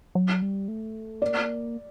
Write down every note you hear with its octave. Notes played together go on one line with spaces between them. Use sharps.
F#3
G3
A3
A#3 D5